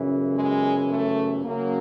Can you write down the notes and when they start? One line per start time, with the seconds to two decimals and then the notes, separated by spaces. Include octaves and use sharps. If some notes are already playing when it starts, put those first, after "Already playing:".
Already playing: G1 F#2 C#3 E3
0.33 G#3
0.88 A3
1.44 F#2 C#3 F#3 A#3